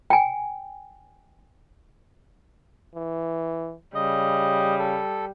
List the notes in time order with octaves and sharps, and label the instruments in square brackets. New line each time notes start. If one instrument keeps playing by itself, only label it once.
[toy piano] G5 G#5
[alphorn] E3
[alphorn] C#3 [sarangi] G3 [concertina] D#5
[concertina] A4